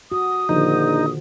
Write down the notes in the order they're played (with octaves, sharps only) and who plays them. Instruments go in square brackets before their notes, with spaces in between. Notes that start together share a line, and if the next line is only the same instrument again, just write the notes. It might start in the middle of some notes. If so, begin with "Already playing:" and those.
[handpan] F#4 [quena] D#6
[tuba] A#1 [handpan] D3 D#3 F3 [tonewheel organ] D#4